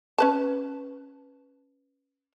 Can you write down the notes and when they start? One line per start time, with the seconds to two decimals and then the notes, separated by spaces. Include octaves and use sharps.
0.18 C#4 B4 A5